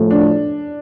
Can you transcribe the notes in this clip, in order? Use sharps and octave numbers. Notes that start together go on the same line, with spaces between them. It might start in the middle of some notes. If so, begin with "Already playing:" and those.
Already playing: A2 F3 A3
D4